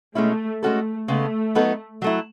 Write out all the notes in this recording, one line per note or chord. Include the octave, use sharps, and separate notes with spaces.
B2 G#3 A3 C#4 E4
G#3 A3 C#4 F#4 A4
C#3 G#3 A3 B3
F#3 B3 D#4 A4
F#3 A3 E4